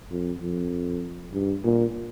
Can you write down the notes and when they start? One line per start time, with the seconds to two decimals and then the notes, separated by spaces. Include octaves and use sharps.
0.11 F2
0.41 F2
1.33 G2
1.63 A#2